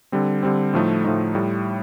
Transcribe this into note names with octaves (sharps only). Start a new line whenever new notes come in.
D3 G3 C4
D3 G3 C4
A2 F3 A3 D#4
A2 F3 A3 D#4
A2 G3